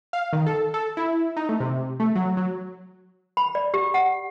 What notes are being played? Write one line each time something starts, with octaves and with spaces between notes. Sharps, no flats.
F5
D#3
A4
A4
E4
D#4
A3
C3
A3
F#3
F#3
B5
D5
G4
F#5